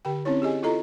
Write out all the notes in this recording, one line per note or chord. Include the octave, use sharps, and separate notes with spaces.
D3 G4 G5
C4 C#4 D#4 E4 C#5
G4 G#4 D#5 G#5
E4 F4 A4 D#5 A#5